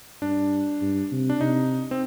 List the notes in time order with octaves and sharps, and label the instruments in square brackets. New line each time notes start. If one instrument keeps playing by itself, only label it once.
[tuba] G2 [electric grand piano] D4
[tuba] G2
C3
[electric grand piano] D4
[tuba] C3 [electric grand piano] D#4
[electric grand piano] C4